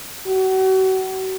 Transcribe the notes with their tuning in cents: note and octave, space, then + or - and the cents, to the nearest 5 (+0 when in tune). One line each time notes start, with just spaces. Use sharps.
F#4 +35